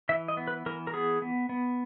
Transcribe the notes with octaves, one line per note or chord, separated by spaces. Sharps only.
E3 E5
D#5
B3
B4
E3 A#4
A#4
B3 G#4
B3
B3